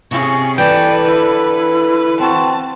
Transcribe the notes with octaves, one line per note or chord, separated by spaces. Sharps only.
C3 C#4 G#4 C#6
E3 A4 B4 D5 G5
D3 E4
C4 F#4 A5